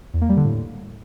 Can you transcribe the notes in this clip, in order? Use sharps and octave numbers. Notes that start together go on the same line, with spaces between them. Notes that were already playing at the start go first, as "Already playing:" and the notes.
E2
A#3
G3
D3
A2